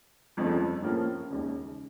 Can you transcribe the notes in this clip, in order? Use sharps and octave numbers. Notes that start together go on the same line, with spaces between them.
G1 F2 C#3 F3 A3
A2 F3 A#3 C#4
E1 D#2 C#3